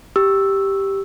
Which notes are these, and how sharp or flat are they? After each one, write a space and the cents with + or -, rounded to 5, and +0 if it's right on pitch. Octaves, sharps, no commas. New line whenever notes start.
G4 +0 E6 +0